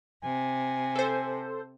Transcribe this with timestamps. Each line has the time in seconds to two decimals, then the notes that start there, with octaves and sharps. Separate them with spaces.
0.24 C3 G#5
0.95 A4 C5